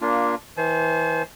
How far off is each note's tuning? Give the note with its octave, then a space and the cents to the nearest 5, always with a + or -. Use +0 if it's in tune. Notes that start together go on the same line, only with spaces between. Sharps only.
A#3 +10 D4 -15 F4 +0
E3 -25 C5 +0 A5 -45